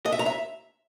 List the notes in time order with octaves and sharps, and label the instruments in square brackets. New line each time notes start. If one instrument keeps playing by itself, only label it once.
[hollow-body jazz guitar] D#5
E5
A#5
E5